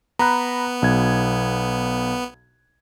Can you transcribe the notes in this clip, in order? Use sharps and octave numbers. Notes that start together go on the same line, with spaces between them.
B3 A#5 B5 F#6
B1 G#6